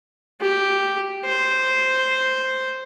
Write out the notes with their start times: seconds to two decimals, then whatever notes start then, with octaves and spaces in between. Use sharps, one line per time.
0.41 G4
1.26 C5